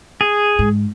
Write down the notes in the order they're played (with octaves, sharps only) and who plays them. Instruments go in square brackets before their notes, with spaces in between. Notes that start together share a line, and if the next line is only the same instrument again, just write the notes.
[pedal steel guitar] G#4
[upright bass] G#2